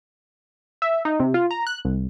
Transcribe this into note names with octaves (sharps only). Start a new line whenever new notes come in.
E5
D#4
C3
F4
A#5
F#6
C2